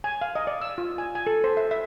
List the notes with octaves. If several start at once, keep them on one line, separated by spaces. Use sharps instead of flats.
G#5
F5
D#5
D5
E6
F4
G#5
G#5
A4
C5
E5
E5